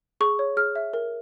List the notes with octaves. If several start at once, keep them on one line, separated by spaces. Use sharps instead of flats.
G#4 C#6
C#5
G#4 F6
E5
A#4